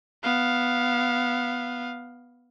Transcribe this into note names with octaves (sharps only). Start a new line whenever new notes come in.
B3 F5